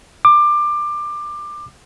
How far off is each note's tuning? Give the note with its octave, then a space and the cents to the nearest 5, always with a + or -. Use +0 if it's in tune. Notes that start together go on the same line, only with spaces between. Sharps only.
D6 +20